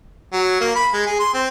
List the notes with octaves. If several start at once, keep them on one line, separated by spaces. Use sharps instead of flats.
F#3
A#3
B5
G#3
G#4
C6
C4